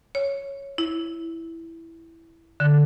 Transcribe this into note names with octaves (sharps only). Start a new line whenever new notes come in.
C#5
E4
D3